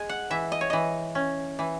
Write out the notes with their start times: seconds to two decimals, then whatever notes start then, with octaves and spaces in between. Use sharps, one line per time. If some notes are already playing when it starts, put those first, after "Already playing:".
Already playing: G#3 G#5
0.09 F#5
0.30 E3 E5
0.52 D#5
0.61 C#5
0.70 E3 D#5
1.15 C#4
1.59 E3